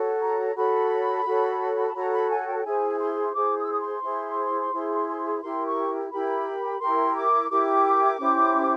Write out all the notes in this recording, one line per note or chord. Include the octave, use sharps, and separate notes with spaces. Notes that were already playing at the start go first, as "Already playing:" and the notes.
Already playing: F#4 A4 C#5
A#5
F#4 A4 C#5 B5
F#4 A4 C#5
A5
F#4 A4 C#5 A#5
B5
G#5
G5
G5
E4 G#4 C5 G#5
C6
E4 G#4 C5 D6
D#6
E6
D#6
C6
E4 G#4 C5
E4 G#4 C5
B5
E4 G4 A#4 C6
C#6
E4 G4 A#4 B5
E4 G4 A#4 C6
D6
E4 G4 A#4 D6
C#4 E4 G4 C5